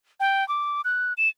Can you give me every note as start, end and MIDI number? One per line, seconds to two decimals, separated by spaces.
0.20 0.47 79
0.48 0.81 86
0.85 1.13 90
1.18 1.29 100